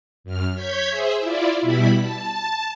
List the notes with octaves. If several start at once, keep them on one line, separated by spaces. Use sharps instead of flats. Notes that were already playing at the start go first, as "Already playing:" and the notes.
F#2 F6
C#5 G6 G#6 B6
G#4 C5 E5
E4 F4 D5
B2 G3 E4 B5 B6
A5